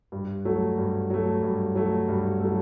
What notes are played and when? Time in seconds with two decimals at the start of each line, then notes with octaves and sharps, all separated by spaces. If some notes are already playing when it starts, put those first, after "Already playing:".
0.12 G2
0.45 F#3 A3
0.78 G2
1.10 F#3 A3
1.43 G2
1.75 F#3 A3
2.08 G2
2.40 F#3 A3